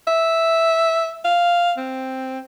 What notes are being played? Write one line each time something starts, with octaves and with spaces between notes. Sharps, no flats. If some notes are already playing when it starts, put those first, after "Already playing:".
E5
F5
C4